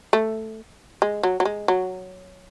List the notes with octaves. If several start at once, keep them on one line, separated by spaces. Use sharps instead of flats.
A3
G#3
F#3
F#3
G#3
F#3